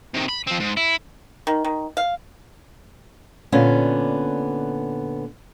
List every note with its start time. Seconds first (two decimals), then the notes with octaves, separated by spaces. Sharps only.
0.14 C3 D#3
0.28 B5
0.47 F3 C4
0.60 G#2
0.77 E4
1.47 D#3
1.64 D#3
1.97 F5
3.52 A#2 D3 B3 C#4